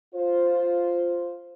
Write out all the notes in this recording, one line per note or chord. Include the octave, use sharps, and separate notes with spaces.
F4 C5